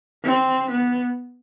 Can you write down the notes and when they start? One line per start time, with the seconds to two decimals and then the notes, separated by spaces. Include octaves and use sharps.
0.24 C4
0.71 B3